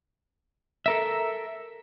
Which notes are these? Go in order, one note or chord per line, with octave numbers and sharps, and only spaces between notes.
A4 A#4 E5